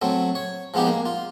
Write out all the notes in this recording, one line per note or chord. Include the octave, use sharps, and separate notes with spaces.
F#3 A3 C4
C#5
F3 G#3 B3 D#4 G4
A#3
F4